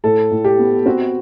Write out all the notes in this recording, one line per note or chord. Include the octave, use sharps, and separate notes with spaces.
A2 A4
A2
G4
B3
C4 F#4